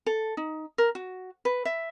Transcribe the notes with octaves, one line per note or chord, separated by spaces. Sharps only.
A4
D#4
A#4
F#4
B4
E5